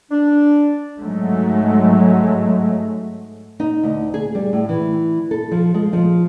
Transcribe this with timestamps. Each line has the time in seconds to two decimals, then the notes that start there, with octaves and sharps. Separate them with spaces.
0.12 D4
0.98 G#2 F#3 G#3 A3
3.60 D#4
3.83 D2
4.14 G#4
4.35 G3
4.53 A2
4.69 E3
5.31 A4
5.51 F3
5.74 G#3
5.93 F3